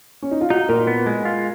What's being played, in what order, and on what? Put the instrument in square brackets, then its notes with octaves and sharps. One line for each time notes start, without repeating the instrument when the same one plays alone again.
[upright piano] C#4
D#4
F4
[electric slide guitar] D#4 [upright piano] F#4
[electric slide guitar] A#2 [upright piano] A#4
[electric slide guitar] B3
G#3
F4